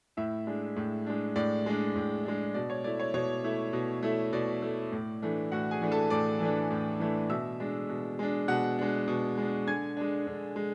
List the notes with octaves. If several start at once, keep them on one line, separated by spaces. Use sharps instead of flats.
A2 E4 E5
G#3 D4
A2
G#3 D4
A2 D5
G#3 D4
A2
G#3 D4
B2 D5
C#5
A3 E4 D5
C#5
B2 C#5
A3 E4
B2
A3 E4
B2 D5
A3 E4
A2
E3 A3 D4
A2 F#4 F#5
G#4 G#5
E3 A3 D4
A4 A5
A2 D5 D6
E3 A3 D4
A2
E3 A3 D4
B2 E5 E6
G#3 D4
B2
G#3 D4
B2 F#5 F#6
G#3 D4
B2
G#3 D4
D3 G#5 G#6
G#3 D4
D3
G#3